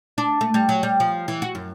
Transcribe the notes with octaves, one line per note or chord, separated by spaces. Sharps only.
D4
A3
G3
F#3
G3
F3
E3
F#4
F#2